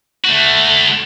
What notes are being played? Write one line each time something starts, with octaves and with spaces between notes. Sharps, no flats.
A3 F#4